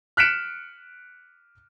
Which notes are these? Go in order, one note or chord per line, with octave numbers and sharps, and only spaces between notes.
F6 F#6 B6 C#7 D7 E7